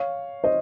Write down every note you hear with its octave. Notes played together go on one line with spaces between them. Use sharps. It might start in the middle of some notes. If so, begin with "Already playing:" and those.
Already playing: C#5 F5
C5 D#5